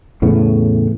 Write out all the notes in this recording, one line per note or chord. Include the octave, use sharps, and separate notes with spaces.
E2 A2 C#3 B3